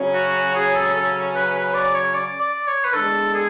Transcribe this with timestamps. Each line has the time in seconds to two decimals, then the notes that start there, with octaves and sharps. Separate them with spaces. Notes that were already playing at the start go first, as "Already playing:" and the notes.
Already playing: C#3 F#3 C#4
0.14 F#4
0.55 G#4
0.75 A4
0.94 A4
1.35 B4
1.55 B4
1.74 D5
1.95 C#5
2.14 D5
2.40 D5
2.67 C#5
2.84 B4
2.93 E2 D3 G#3 D4 A4
3.34 G#4